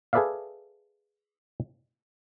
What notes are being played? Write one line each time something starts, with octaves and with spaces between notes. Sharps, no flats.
G#4 A4 B4 D5 E5 F5